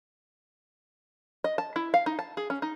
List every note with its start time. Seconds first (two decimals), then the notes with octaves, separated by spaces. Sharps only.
1.44 D#5
1.58 A5
1.76 E4
1.94 F5
2.06 D#4
2.19 A5
2.37 G#4
2.50 C#4
2.62 D#4